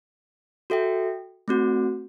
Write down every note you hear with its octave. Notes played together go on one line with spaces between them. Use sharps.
F#4 A4 E5 G5
A3 C4 F#4